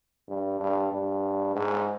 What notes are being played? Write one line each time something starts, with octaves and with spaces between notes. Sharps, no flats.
G2
G2
G2
G#2